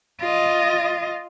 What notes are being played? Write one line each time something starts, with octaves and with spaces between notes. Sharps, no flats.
F4 D#5